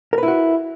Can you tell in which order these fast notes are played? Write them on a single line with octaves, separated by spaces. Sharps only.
A#4 B4 E4 F#4